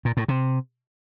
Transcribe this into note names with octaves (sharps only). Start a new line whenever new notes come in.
A#2
A2
C3